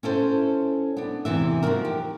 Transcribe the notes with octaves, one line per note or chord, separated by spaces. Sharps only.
C#4 E4 A4 C5
B3 D4
E2 C3 E3 E5
F3 A#3 D#4 F#4 A#4
G4